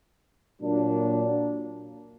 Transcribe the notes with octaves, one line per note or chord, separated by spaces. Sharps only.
A#2 F#3 A#3 D4